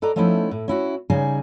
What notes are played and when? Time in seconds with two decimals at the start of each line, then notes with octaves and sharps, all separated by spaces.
0.02 A4 B4 D5 D#5 A#5
0.16 F3 A3 B3 C#4 D#4 E4
0.51 A2
0.68 C#4 E4 F#4
1.10 C#3 G3 D#4 G#4 G#5